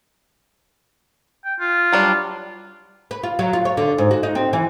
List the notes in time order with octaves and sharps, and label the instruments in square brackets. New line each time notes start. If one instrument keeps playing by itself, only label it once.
[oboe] G5
F4
[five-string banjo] F#3 G3 D4
[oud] B4
F4
F#3
F4
C#5
D3
G#2
F#4
D#4
C4
E3